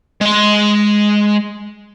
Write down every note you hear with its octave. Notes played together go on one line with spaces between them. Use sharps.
G#3 C6